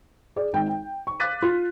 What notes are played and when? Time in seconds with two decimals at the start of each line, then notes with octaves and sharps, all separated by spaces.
0.36 G#4 D5
0.53 G#1 G5
0.68 G5
1.07 C#6
1.20 F5 D6 F#6 A6 B6 D#7
1.42 F4